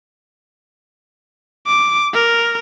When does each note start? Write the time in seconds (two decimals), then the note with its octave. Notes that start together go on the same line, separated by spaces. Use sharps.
1.67 D6
2.14 A#4